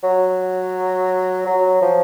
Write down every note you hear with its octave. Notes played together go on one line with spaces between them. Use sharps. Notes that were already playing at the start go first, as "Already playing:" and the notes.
F#3
F#3
F3